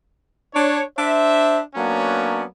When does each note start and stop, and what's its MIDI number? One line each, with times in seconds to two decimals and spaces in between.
0.53 0.81 62
0.53 0.81 73
0.96 1.59 62
0.96 1.59 72
0.96 1.59 76
1.75 2.43 54
1.75 2.43 58
1.75 2.43 59
1.75 2.43 61
1.75 2.43 62